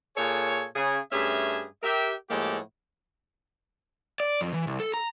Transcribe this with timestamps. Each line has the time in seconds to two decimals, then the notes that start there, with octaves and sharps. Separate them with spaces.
0.17 A#2 G#4 A4 C#5
0.76 C#3 G#4
1.12 G2 A3 C#4 G#4 E5
1.83 G4 A#4 E5
2.30 A2 F3 G#3 A#3 G4 A4
4.20 D5
4.41 F2
4.54 E3
4.67 C2
4.80 A4
4.94 A#5